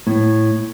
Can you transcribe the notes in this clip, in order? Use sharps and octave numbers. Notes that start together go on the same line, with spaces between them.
A2